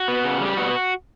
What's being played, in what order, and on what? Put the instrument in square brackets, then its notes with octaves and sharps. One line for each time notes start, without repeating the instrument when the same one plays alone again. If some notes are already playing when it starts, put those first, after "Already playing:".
Already playing: [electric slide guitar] F#4
B3
C#3
G3
G4
B3 F#4